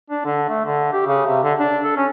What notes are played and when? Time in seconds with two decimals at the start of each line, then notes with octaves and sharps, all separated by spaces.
0.10 D4
0.25 D3
0.49 A3
0.66 D3
0.93 G4
1.06 C#3
1.26 C3
1.44 D3
1.59 D4
1.84 A4
1.97 C#4